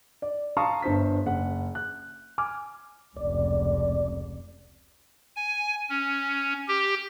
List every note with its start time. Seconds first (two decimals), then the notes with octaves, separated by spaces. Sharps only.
0.22 D5
0.57 F5 A5 A#5 C6 C#6 D#6
0.82 G1 G2 C5 B6
1.26 F#1 F#5
1.75 F#6
2.38 G#5 D6 F6
3.17 F1 C#2 D5
5.36 G#5
5.89 C#4
6.68 G4